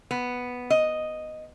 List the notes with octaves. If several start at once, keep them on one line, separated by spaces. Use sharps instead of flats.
B3
D#5